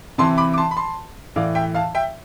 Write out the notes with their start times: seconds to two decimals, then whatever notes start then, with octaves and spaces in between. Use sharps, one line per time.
0.18 C3 E3 A5 C6
0.38 B5 D6
0.54 D6
0.58 A5 C6
0.71 B5
0.77 A5 C6
1.36 A2 E3 D5 F5
1.55 E5 G5
1.75 F5 A5
1.95 E5 G5